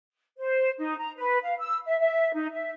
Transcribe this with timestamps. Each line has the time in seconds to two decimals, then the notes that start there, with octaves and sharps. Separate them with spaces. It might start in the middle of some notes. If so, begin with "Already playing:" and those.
0.38 C5
0.78 D#4
0.97 A#5
1.18 B4
1.42 F5
1.59 E6
1.86 E5
1.99 E5
2.34 D#4
2.52 E5